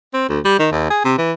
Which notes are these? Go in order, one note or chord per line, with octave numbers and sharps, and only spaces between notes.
C4
D2
G3
D#3
D#2
G#4
C3
E3